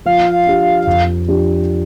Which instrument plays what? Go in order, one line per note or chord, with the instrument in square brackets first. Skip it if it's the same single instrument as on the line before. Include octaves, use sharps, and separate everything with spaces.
[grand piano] F3 [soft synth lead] F5
[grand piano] D4 G4
F2
F3 D4 G4